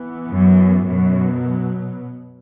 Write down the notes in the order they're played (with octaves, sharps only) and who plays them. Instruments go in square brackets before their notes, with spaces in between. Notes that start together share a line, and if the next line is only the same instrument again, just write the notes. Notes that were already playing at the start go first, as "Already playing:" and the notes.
Already playing: [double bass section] E3 B3
[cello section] F#2
[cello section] F#2 [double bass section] B2 F#3 B3